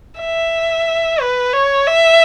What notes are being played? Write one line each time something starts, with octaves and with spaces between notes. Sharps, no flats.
E5
B4
C#5
E5